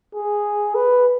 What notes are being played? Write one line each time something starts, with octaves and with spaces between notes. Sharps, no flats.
G#4
B4